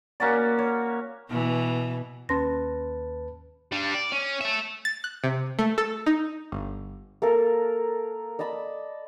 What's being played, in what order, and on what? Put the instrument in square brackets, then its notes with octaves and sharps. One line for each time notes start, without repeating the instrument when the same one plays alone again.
[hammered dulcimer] A#3 C#4 F#4 D5
C#5
[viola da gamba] B2 E3
[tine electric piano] D#2 B4 A5 [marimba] C#4 C6 A#6
[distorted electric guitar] G3 D4
D5
C#4
A4 E5
[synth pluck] A6
F#6
C3
A3
A4
D#4
G1
[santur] A#3 A4 A#4
D5 D#5 A5 B5